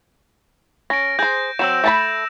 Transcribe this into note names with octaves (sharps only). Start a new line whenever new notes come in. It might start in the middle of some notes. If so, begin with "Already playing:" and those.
C#4 A#6 D7
G#4 C5 G6 A#6
F#3 C4 E6 E7
A3 A5 B5